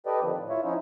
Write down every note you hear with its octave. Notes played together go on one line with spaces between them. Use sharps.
G4 A4 B4 D5 D#5
D3 D#3 F3 C4
A2
E4 F4 C#5 E5
F3 C#4 D#4 E4